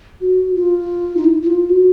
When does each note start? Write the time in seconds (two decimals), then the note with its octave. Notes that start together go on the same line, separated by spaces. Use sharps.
0.21 F#4
0.56 F4
1.17 D#4
1.24 E4
1.42 E4
1.47 F4
1.69 F#4